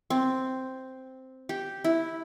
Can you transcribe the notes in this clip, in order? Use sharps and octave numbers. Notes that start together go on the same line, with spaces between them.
C4
G4
E4